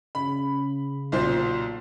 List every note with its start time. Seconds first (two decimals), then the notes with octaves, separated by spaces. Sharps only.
0.15 C#3 B5
1.12 B1 A#2 C5